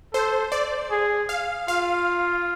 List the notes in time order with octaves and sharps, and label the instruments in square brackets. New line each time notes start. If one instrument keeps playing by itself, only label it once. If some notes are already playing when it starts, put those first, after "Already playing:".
[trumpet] A4 [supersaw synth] C5
[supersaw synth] D5
[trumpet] G#4
[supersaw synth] F5
[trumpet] F4 [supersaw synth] F5